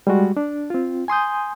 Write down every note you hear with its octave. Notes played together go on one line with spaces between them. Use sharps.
G3 G#3 F#4
D4
C4 F4
G#5 C6 D#6 G6